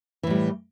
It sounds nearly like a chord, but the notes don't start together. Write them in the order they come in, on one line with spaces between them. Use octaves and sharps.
E3 A2 G3